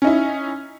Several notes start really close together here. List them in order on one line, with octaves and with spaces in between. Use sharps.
C#4 D#4 E4